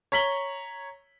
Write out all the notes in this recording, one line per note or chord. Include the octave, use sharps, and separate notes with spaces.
C#5 A#5 B6 F#7 G7